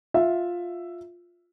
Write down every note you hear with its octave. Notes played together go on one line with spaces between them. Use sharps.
F4 E5